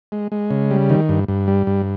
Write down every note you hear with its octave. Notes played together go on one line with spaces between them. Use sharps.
G#3
G#3
C#3
G3
D#3
G2
G2
G3
G2